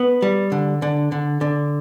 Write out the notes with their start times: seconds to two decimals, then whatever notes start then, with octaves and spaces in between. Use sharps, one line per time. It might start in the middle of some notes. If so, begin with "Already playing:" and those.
Already playing: B3
0.22 G3
0.52 D3
0.82 D3
1.12 D3
1.41 D3